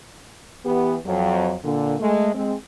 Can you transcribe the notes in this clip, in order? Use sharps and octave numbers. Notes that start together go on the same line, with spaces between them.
E3 B3 G4
F2 F#3
A#2 D3
G#3 A3
G#3 C4